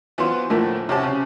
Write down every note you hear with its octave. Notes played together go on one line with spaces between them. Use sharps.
E3 F#3 B3 F4 C5
A2 D3 E3 F3 A3 A#3
C3 C#4 F#4 G4 A5
C#3